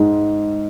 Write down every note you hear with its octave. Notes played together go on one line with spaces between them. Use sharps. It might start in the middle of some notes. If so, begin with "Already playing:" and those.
Already playing: G#2 G#3